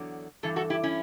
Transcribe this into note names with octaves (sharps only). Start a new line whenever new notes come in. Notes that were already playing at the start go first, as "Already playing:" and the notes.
Already playing: E2 D3 F#3
G2 E3 A4
F#4 A4
E4 G4
C#4 E4